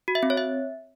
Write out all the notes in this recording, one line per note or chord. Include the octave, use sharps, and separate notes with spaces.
F#4
E5
C4
C#5
E5